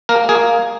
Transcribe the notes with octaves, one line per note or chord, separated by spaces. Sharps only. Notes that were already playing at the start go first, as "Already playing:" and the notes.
A#3 A#4
A#3 G#4